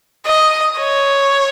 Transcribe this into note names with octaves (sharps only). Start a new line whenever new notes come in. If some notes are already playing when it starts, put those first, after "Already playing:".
D#5
C#5